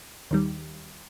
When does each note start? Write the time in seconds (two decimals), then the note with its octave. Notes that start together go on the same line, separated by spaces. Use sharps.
0.31 D#2 D#3 G3